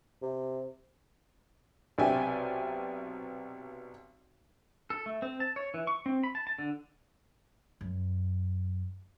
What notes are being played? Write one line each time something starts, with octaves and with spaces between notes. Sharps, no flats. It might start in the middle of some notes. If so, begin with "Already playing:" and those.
C3
B1 C3 D5 E5 G5 G#5
A4
A3
C4
A5
C#5
E3
C#6
C4
B5
A5
A5
D3
F#2